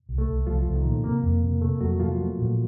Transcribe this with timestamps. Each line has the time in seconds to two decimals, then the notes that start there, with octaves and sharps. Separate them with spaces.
0.09 C2
0.18 A3 A4
0.28 C2
0.46 C2 F3 F4
0.66 C2
0.75 D#3 D#4
0.85 A#2
1.04 C3 A#3 A#4
1.23 F2
1.43 C3
1.61 C3 A3 A4
1.80 F2 F#3 F#4
2.00 C3 F3 F4
2.19 A3
2.38 A#2